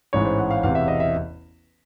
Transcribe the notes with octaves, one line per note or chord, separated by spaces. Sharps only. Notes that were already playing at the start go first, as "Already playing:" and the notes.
A1 G#2 E3 C#5
C5
F#5
F5
E1 E2 C3 F5
E5
D#5
E5